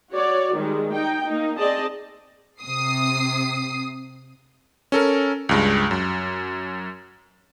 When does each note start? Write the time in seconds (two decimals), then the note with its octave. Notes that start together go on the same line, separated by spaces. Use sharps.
0.11 F#4 C#5 D5
0.55 D#3 G3 G#3
0.93 D#4 G5
1.26 A#3 D#4
1.57 C4 G#4 D5 D#5 A5
2.62 C3 D#6 C7
4.92 C#4 A4 A#4
5.49 C#2 G2 G#3
5.91 F#2